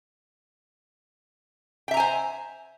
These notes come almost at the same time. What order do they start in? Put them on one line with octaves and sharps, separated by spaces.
G5 E5 A#5 G#5 C5